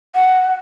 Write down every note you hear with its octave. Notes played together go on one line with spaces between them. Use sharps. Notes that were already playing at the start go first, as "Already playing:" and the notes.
F#5